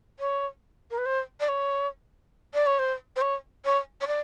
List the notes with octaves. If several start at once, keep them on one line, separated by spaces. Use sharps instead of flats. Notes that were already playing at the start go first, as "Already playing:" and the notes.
C#5
A#4
B4
C5
D5
C#5
D5
C#5
C5
C5
C#5
C#5
C#5
D5